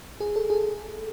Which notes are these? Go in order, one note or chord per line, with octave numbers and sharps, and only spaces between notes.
G#4
A4
G#4